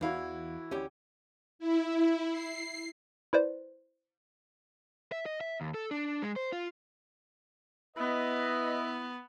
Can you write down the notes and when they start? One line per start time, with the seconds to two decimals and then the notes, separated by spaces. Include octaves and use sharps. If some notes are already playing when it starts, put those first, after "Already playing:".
0.01 E2 E3 E4 F#4 F5
0.71 D2 C#4 G4
1.59 E4
2.32 C7
3.33 E4 B4 C5 D5
5.12 E5
5.26 D#5
5.41 E5
5.61 D#2
5.74 A4
5.91 D4
6.22 G#3
6.36 C5
6.52 F4
7.97 B3 E4 B4 D#5